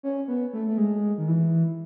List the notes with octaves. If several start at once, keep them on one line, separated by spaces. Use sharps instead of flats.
C#4
B3
A3
A3
G#3
D#3
E3